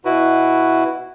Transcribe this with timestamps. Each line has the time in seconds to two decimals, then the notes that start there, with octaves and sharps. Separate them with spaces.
0.05 B2 E4 F#4 B4